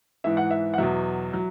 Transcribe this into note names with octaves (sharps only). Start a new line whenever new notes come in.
G#2 E3 E5
F#5
E5
F#5
E2 B2 F#3 E5
F#3